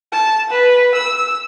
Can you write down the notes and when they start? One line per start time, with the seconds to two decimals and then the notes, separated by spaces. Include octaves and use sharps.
0.12 A5
0.51 B4
0.95 E6